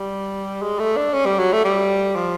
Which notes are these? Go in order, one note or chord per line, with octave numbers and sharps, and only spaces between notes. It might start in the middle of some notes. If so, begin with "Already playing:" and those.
Already playing: G3
G#3
A3
D4
C#4
G3
F#3
A3
G3
F3